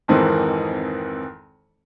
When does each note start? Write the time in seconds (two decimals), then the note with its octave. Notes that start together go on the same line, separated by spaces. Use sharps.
0.08 G#1 F2 D#3 E3 G#3 C4